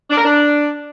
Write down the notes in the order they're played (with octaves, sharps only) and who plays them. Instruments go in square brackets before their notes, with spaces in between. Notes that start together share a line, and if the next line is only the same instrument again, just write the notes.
[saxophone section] D4
A#4
D4